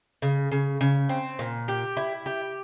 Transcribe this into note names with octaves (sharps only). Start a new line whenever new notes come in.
C#3
C#3
C#3
C4
A#2
G4
E4
G4